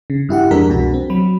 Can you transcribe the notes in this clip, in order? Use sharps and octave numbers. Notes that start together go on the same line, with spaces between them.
C#3
G2 E4 G4 F#5
F2 G#3 D4 A#4 B6
C2 B2 F#4
C4
F#3 B5